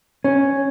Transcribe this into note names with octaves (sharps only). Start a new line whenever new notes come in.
C#4